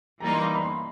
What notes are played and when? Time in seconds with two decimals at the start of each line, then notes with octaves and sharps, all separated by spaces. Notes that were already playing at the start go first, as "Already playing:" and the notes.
0.20 E3 G3 A#3 D#4 A#5
0.33 C6
0.41 B5
0.55 B5
0.63 C6